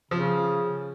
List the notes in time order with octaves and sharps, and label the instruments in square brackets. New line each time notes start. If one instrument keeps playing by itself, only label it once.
[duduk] C#3 [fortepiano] F3